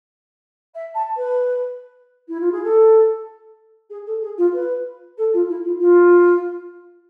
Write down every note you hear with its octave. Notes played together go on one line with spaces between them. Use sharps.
E5
A5
B4
E4
F4
G#4
A4
G#4
A4
G#4
F4
B4
A4
F4
E4
F4
F4